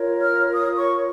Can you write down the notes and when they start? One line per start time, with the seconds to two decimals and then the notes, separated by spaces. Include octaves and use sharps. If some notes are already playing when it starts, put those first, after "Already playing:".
Already playing: F4 A#4 C#5
0.21 F6
0.52 D#6
0.76 C#6